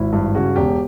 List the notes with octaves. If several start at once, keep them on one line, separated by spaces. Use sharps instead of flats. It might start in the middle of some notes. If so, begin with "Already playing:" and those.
Already playing: G#1 E4
G2
C#3 F#4
E1 G4